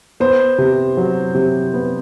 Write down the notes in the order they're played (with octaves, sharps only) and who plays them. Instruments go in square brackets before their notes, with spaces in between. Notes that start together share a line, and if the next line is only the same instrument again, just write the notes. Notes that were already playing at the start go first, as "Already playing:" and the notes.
[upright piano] B3 [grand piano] C5
[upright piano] C3
F#3
C3
B3